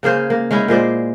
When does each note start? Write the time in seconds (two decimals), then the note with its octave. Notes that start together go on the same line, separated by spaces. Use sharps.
0.03 C#3 A#3 G#4 C5
0.30 A#3
0.51 G#3 C#4 D#4 E4
0.68 A#2 G#3 C5 D5